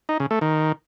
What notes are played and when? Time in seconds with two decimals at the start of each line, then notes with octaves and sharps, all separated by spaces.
0.09 D#4
0.20 C#3
0.31 A3
0.41 D#3